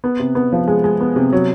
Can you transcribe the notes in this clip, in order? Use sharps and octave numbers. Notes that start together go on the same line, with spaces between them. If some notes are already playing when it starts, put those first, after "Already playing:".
B3
C3
B3
F3
G#3
G#3
B3
C3
F#3